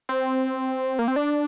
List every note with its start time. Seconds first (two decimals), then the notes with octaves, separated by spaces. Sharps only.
0.09 C4
0.99 A#3
1.08 C4
1.16 D4